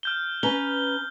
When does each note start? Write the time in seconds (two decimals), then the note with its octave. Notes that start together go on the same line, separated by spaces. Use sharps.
0.03 F6 G6 G7
0.43 C#4 B4 A#5 G7